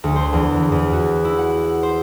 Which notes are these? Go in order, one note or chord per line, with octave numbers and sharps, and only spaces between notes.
D2
C5
E2
E3
E2
F#4
E4
F#5
C5